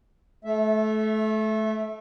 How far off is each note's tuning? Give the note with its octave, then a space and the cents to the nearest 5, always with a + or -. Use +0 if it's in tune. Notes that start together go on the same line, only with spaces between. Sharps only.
A3 -25 E5 +0